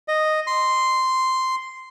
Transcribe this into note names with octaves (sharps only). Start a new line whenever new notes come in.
D#5
C6